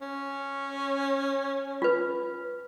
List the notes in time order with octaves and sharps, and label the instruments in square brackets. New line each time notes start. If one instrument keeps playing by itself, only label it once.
[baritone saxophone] C#4
[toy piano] F4 B4